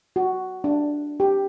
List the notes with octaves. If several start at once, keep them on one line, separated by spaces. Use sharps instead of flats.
F#4
D4
G4